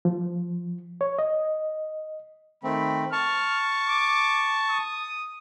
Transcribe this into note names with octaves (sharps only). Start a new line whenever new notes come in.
F3
C#5
D#5
D#3 A3 C4 B5
A5 C#6 F6
D6
D#6